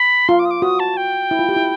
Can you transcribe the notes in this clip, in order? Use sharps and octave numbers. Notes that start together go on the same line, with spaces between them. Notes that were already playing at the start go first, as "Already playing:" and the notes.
Already playing: B5
F4 C6
D6
D#6
D6
F#4 D#6
A5
G5
E4
F4
G4
E4